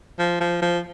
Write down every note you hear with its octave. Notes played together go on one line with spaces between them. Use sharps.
F3
F3
F3